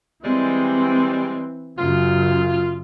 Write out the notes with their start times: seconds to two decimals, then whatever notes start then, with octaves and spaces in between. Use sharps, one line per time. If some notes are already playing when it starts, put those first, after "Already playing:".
0.24 E3 G3 G#3 C4
1.78 F#2 C#3 F4